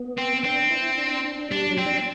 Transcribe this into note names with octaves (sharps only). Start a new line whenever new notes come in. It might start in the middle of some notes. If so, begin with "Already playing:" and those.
Already playing: B3
C4
C4 D4
E4
D4
D4
G3 D4
F#3
C4
D4